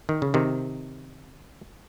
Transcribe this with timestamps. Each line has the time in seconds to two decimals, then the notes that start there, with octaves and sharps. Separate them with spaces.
0.09 D#3
0.22 C#3
0.34 C3 D#3